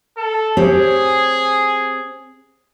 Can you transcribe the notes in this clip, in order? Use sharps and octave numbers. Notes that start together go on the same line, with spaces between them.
A4
C4 G4 G#4 C#5